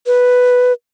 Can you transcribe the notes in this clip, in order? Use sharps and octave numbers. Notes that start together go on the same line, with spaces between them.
B4